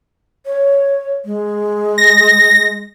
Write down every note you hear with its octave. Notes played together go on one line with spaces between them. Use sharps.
C#5
G#3
A#6